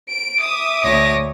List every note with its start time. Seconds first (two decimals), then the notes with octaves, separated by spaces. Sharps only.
0.11 D7
0.42 E5 D6 D#6
0.82 D2 C#5 A#6